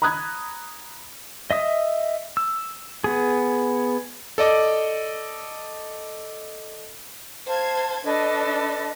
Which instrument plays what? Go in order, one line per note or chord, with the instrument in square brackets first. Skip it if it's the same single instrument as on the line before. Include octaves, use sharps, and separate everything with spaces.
[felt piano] A#5 B5 D#6 F#6 G#6
[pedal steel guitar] D#5 E5 D#6
E6
B3 G#4
[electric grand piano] A4 D5 D#5 D6
[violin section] C5 G#6 [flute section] F5 A5
[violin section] D4 [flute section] A4 B4 D#5